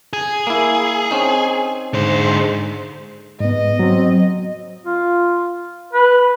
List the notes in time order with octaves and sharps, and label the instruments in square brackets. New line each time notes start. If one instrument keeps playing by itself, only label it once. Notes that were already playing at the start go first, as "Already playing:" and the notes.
[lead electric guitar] G#4
[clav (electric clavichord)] A#3 E4
C4 C#4 D#4
[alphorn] G#2 [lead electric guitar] D3 C5
[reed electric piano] G#2 B3 [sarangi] D#5
[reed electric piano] F#3 C4
[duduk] F4
B4